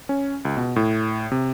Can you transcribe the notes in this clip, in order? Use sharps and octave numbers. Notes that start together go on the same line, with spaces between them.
C#4
C#2
B2
A2
C3